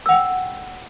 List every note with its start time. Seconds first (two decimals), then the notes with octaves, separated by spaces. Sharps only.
0.06 E6
0.09 F#5
0.12 G5